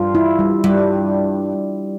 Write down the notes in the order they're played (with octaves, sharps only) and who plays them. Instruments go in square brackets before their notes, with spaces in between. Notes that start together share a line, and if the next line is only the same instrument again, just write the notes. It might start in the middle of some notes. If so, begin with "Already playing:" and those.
Already playing: [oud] G2 [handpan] F4
[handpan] E4
G3
[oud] G2 [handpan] G3